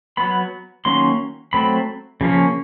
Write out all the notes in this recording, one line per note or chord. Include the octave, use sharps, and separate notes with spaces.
F#3 B3 B5
D#3 F#3 A#3 C#4 C6
F#3 A3 C4 B5
C#3 F3 A#3 C#4